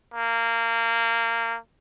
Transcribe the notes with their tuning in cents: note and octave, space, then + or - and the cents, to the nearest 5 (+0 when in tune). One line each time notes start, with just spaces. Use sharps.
A#3 -20